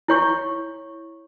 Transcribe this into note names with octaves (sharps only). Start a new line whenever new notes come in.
E4 C#5 C#6